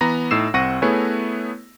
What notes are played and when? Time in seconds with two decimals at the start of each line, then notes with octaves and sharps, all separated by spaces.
0.01 E3 B3 A#5 B5 A#6
0.31 A2 D#4 E6 C7 E7
0.54 C2 C4 F#5 C#6 A#6 D#7
0.82 A3 B3 E4 G#4 B4 C#5